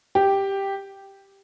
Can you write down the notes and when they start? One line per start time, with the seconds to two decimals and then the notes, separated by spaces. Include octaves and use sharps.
0.15 G4